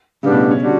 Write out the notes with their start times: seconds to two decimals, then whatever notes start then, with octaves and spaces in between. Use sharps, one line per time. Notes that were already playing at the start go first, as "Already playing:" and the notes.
0.23 A2 C#3 G3 B3 D4
0.32 B2
0.51 C#4
0.60 D3 G3 D4 F#4